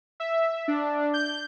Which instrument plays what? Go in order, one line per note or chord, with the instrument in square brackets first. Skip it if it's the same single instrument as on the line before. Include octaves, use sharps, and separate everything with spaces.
[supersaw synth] E5
D4
G6